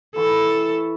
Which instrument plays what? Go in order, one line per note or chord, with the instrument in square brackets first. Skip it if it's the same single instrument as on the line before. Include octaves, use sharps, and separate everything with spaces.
[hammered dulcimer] E3 B5 C#6 [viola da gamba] A4